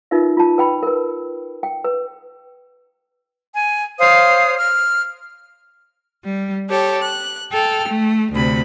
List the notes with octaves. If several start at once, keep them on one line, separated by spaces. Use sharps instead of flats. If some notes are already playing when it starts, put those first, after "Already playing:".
D#4 F4 A#4 B4 E5
F4 A5
B4 G5 B5
A#4 B4
G5
B4
G#5
C5 C#5 F5 D#6
F6
G3
G4 A4 C#5
F#6
A4 G5 F6
A3
D2 C3 B5